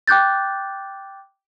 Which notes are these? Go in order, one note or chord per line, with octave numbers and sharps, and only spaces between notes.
G5 D6 F#6 G6 A6